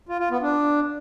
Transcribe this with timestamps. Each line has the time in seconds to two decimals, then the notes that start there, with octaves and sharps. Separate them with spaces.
0.09 F4
0.20 F4
0.31 B3
0.42 D4